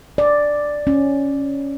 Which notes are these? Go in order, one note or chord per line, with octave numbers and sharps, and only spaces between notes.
D5
C#4